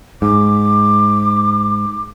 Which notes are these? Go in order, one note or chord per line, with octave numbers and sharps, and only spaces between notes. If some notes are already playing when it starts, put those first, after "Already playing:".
G#2 D6